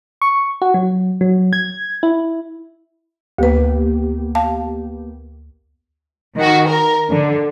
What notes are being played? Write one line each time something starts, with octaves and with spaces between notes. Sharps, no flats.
C#6
F#4
F#3
F#3
G#6
E4
D2 A#3 B3 G4 B4
F5 A5
D#3 F#4
A#4
D3